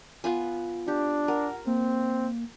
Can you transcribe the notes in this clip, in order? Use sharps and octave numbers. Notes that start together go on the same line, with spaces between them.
B3 F4 G#5
D4 G4
A#4 F#5
A#3 C4